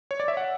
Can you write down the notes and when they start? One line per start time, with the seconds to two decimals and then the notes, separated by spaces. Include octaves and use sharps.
0.11 C#5
0.20 D5
0.28 E5
0.37 F#5